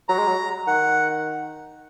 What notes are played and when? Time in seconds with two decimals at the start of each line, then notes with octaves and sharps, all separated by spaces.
0.09 F#3 A#5
0.18 G#3
0.28 F#3
0.67 D#3 F#5